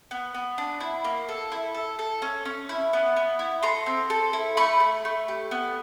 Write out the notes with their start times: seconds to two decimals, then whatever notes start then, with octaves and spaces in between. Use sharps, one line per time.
0.11 B3
0.34 B3
0.58 D4
0.80 E4
1.04 A#3
1.29 A4
1.52 E4
1.74 A4
1.99 A4
2.22 C#4
2.45 C#4
2.69 E4
2.93 B3
3.16 B3
3.39 E4
3.63 A4 A#5 C6
3.86 C4
4.10 A4
4.33 E4
4.57 A3 B5 C#6
4.80 A3
5.05 A3
5.28 G4
5.51 B3